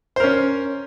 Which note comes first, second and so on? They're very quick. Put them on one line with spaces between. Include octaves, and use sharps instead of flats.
C5 A#4 C#4